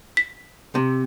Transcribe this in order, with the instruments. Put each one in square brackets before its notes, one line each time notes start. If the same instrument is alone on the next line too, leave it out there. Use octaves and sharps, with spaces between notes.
[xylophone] B6
[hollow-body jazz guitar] C3